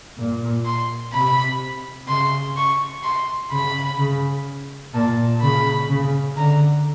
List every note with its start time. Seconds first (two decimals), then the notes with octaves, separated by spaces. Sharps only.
0.17 A#2
0.65 C6
1.13 C3 B5
2.08 C#3 C6
2.56 C#6
3.04 C6
3.51 C#3 B5
3.98 C#3
4.94 A#2 A5
5.41 C#3 B5
5.89 C#3
6.37 D3 A#5